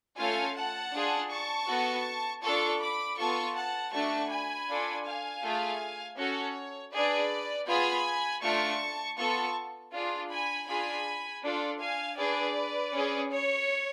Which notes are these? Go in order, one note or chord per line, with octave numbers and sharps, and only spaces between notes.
A3 C#4 F4 A4 F5 G#5
F#5 A5
D4 F4 G#4
A5 C#6
B3 F#4 A4
D4 F4 A4 A5 C#6
B5 D6
B3 F4 A4 A5 C#6
F#5 A5
A3 D4 F#4 A5 C#6
G#5 B5
D4 F4 A4
F5 G#5
A3 F4 G#4
C#4 F#4 A4 C#5
D4 G#4 B4 D5
B3 F4 G#4 G#5 B5
A3 D4 F4 A5 C#6
B3 F4 A4 A5 C#6
D4 F4 G#4
G#5 B5
D4 F4 G#4 G#5 B5
D4 F4 A4
F5 G#5
D4 G#4 B4 D5
C#4 G#4
C#5